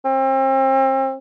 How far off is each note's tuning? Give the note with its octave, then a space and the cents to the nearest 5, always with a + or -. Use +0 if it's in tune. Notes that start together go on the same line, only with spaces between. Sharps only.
C4 +35